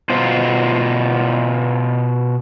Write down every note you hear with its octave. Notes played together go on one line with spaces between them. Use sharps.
B2 F4 C5